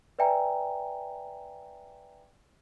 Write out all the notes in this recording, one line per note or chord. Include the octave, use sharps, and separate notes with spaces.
B4 D5 E5 G5 G#5 A#5